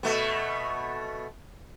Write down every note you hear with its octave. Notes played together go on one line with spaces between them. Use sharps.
B2 A3 B3